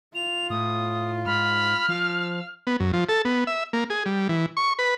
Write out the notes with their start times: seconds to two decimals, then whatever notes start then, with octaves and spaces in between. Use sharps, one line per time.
0.15 F4 F7
0.50 A2 D#6
1.26 G#2 B5 F6
1.89 F3 F5
2.67 B3
2.80 F#2
2.93 F3
3.09 A4
3.25 B3
3.47 E5
3.73 A#3
3.90 G#4
4.06 G3
4.29 E3
4.57 C#6
4.79 B4